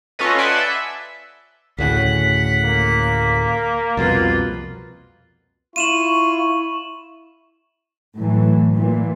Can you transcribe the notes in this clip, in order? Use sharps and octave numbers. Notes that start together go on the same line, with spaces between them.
C#4 F4 A4 B4 D#5
B4 D5 F#5 G#5 A5 C6
E5
D2 A2 C#3 F#5 B6
A#3
C2 F2 B2 F4 B4 A6
E4 F4 C#6 D#7 E7 F#7
A2 E3 F#3
A#2 E3